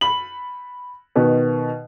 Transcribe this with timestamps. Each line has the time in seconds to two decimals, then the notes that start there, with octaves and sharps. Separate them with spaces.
0.01 B5 F#7
1.15 B2 D#3 B3